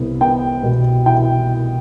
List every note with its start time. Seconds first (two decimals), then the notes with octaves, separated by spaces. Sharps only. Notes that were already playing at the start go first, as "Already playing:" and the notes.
Already playing: C2 B3
0.21 B3 G5
0.63 B2
1.06 E4 G5